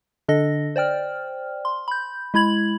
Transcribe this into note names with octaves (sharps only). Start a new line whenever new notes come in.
D3 D4 A4 D#5 A#6
C5 D5 G5 F6
C6
B5 G6
G#3 E4 B5 G#6 F#7